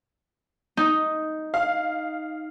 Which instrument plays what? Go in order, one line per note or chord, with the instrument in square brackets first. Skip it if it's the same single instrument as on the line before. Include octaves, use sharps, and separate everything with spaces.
[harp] D#4
[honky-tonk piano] F5